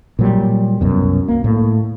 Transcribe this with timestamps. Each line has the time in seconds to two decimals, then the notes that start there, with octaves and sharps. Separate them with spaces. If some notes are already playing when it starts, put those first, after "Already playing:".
0.19 A#2 F#3 G3
0.81 C2 F#2 B2
1.28 A#3
1.44 A2 A#3